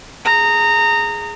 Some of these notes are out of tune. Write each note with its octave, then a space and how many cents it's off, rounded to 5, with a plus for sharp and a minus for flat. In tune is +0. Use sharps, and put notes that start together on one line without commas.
G#4 +0 A#5 -20